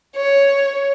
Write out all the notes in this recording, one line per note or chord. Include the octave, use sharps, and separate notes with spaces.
C#5